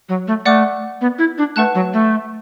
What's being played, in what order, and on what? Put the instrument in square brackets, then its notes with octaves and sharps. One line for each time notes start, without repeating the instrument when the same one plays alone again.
[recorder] F#3
A3
[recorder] A3 [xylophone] D5 F#5 D6 F#6
[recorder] B3
E4
D4
[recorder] A3 [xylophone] B4 F#5 A5 F#6
[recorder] F#3
A3